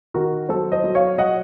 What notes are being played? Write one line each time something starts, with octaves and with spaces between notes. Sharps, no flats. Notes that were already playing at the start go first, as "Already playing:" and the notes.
D#3 F#4 A#4
F#3 A4 C5
C5 D#5
F#3
C#5 F5
F#3 D#5 F#5